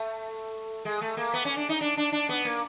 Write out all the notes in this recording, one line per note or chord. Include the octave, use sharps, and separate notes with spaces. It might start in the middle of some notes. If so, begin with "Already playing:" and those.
Already playing: A3
G#3
A3
A#3
B3
C#4
D4
D#4
D4
D4
D4
B3
A#3